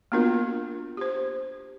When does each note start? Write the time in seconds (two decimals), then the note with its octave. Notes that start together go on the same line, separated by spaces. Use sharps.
0.12 A#3 B3 D4 F4 F#4 A#4
0.97 G4 C5